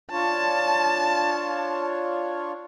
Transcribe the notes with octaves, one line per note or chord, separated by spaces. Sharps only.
D4 F4 C#5 A5